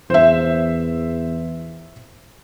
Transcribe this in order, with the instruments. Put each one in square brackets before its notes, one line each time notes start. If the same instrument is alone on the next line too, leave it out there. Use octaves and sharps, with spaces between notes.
[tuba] E2 [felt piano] C5 E5